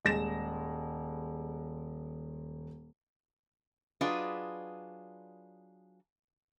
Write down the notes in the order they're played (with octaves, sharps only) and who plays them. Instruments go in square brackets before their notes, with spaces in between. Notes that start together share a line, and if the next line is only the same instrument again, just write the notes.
[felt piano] D#1 G#3 A#6 E7
[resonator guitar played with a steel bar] F#3 D4 F4 G#4 B4 D#5